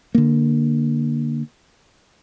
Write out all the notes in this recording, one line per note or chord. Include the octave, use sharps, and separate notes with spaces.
D3 A#3